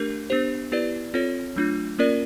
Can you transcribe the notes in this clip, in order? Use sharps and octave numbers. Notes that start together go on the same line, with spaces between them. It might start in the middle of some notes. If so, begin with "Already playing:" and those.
Already playing: A3 D4 G4 A#4
B3 D4 G4 C5
B3 E4 G4 B4 D5
C4 F4 A4 C#5
F#3 A3 D4 F4
A#3 C#4 F4 A#4 D5